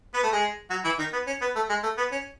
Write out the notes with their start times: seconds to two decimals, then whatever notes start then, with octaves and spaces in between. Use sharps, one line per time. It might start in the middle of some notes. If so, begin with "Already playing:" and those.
0.14 B3 B4
0.23 A3 A4
0.33 G#3 G#4
0.70 F#3 F#4
0.85 E3 E4
0.99 D#3 D#4
1.13 B3
1.27 C#4
1.41 B3
1.56 A3
1.69 G#3
1.83 A3
1.98 B3
2.12 C#4